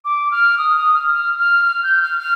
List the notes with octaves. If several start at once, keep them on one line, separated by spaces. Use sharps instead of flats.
D6
F6
D#6
D#6
F6
F6
F6
F6
G6
F6
F6